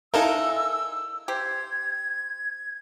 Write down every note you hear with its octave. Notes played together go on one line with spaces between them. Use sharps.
G#3 D#4 E4 A4 A#4 F5 E6
G4 C5 G#6